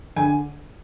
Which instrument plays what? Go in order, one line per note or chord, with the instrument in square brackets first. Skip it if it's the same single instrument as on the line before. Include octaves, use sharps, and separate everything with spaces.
[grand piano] D3 G#5